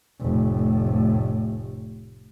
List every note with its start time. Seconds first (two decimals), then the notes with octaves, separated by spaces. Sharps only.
0.21 F1 A2